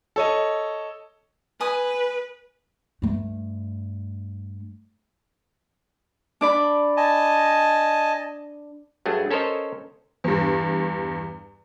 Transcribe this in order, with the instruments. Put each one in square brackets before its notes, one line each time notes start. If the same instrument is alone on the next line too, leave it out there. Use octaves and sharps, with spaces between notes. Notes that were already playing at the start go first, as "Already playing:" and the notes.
[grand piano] A4 C#5 D#5
[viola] B4 [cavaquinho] G#5 B5 D#6
[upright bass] G2 A3
[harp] D4 D5 B5
[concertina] D#5 G#5 A5
[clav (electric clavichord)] G2 F#3 A3 G#4
C#4 A4 A#4 C5 C#5 D#5
[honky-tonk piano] E2 G2